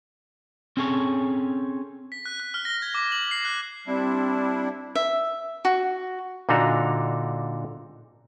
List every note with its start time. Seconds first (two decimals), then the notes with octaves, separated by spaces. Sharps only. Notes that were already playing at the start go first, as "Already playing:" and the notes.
0.77 C4 C#4 G#4 A4 C#5
2.12 B6
2.26 F#6
2.40 F#6
2.54 F6
2.65 A#6
2.82 G#6
2.94 D6
3.12 F#7
3.31 C7
3.45 F#6
3.87 G3 C4 D4 E4
4.95 E5
5.65 F#4
6.49 A#2 D3 D4 D#4 F#4 A#5